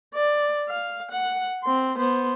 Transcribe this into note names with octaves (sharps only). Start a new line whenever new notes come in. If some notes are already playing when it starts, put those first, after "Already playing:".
D5
F5
F#5
C4 C6
B3 C5